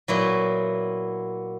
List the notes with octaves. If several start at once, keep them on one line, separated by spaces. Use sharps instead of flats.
A#2 F#3 B3 E4